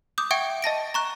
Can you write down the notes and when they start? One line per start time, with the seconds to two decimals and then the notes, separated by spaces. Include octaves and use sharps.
0.18 D6 D#6 G6
0.31 E5 F#5 G5 C#6 G#6 D7
0.62 D#5 A5 A#6 D7
0.94 A#5 C#6 F#6